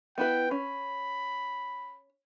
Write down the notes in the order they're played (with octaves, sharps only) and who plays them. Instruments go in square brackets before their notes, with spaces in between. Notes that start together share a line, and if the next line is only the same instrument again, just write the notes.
[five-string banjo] B3 E4 B4 [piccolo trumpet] G5
[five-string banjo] C#4 [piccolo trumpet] B5